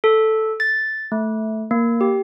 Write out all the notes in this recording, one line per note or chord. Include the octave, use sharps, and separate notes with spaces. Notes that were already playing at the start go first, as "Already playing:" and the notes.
A4
A6
A3
A#3
G4